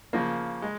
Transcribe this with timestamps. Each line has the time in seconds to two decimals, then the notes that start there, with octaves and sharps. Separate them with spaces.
0.13 C#3 F3 A#3
0.62 G#3